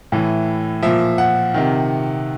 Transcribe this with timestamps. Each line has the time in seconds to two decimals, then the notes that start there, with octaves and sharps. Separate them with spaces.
0.12 A2 E3
0.82 A#2 F3 E5
1.18 F#5
1.54 C3 D#3